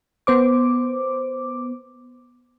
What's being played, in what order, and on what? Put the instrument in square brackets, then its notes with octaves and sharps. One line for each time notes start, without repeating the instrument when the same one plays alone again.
[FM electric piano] B3 C5 D6